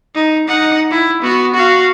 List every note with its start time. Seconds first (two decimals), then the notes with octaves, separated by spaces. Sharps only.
0.15 D#4
0.48 D#4 F#5
0.91 E4
1.22 B3 F#4
1.54 F#4 F5